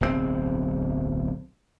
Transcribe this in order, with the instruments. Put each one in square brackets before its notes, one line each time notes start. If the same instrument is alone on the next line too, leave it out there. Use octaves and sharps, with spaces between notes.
[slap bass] D1 B1 C3 C4